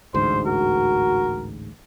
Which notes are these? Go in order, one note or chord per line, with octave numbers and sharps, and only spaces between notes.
A1 D2 G#2 C5
F#4 A#4